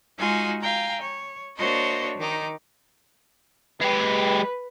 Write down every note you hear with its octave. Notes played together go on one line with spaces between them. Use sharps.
G#3 D#4 F4 F#4 G#5
F5 G5 G#5 A#5
C#5
A#3 D4 F#4 C5 C#5 D#5
D#3 D#4 D6
G#3 G4 B4